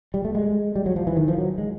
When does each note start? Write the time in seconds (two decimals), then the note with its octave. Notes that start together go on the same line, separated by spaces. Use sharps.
0.14 G3
0.25 A3
0.35 G#3
0.76 G3
0.86 F#3
0.96 F3
1.07 E3
1.17 D#3
1.28 F3
1.38 F#3
1.58 G#3